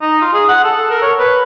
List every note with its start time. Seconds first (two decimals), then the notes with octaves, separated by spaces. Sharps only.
0.01 D#4
0.21 F4
0.33 G#4
0.49 F#5
0.64 A4
0.90 A#4
1.02 C#5
1.19 B4